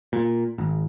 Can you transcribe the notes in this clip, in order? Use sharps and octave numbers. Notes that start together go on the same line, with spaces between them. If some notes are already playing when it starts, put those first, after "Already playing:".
A#2
G#1